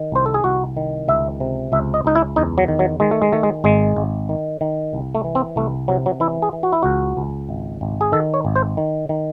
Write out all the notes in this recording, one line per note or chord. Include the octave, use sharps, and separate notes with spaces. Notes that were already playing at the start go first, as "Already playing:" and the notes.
Already playing: D#3
C2 C5
A4
G#4
C2 F#4
D#3
C#2 E5
C3
C#2 E5
D#5
C#2 D#4
E4
E2 D#4
F#3
D#3
F#3
D#3 G#3
A3
G#3
D#3 A3
G#3
G#1 G#3
G#1
D#3
D#3
C2
A3
E3
C4
C2 A3
C3 F#3
F#3
E3 E4
G#4
E3
F#4
E4
C#2 F#4
C#2
G#1
G#1
G#4
D#3 A4
C#5
G#1
C5
D#3
D#3